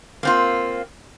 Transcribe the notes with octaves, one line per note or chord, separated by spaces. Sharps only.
A#3 C4 F4